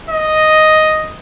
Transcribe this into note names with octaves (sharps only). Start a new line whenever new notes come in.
D#5